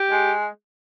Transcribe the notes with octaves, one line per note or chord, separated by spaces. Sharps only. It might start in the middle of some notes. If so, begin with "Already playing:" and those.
Already playing: G4
G#3